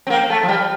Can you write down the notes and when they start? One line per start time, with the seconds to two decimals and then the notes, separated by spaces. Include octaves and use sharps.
0.07 C4
0.10 A#3 G5
0.29 A3 A5
0.43 F3
0.48 G3 G5